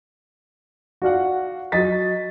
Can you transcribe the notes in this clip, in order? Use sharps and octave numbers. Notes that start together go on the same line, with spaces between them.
F#4 D5 F5 F#5
F#3 D#5 A6 B6